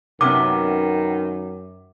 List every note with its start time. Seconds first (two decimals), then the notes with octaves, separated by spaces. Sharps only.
0.21 F#2 C3 D#3 B3 C#4 D6